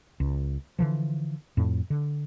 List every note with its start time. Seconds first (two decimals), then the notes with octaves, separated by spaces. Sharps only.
0.20 C#2
0.79 D3 E3 F3
1.57 F2 A2
1.90 D3